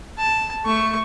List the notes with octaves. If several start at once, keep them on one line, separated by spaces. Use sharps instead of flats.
A5
A3 C#6